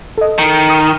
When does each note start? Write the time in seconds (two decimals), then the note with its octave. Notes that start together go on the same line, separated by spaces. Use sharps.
0.18 A4 D#5
0.38 D#3
0.70 D#6 F6